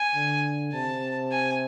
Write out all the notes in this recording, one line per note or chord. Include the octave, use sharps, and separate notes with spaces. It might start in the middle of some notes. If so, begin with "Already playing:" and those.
Already playing: G#5
D3
C3 A5
G#5